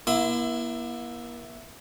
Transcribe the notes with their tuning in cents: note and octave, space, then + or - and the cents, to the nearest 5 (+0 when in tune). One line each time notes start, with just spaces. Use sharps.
A#3 +45 E4 +0 B5 +45